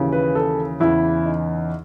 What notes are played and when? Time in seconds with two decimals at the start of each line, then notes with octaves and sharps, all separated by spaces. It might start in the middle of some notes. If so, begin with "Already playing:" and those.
Already playing: D#2 C#3 E3
0.12 B4
0.35 A4
0.80 E2 C#3 E3 E4
1.25 D#4